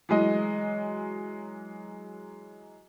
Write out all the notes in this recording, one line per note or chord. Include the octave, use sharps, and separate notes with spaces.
E3 F#3 G#3 D#5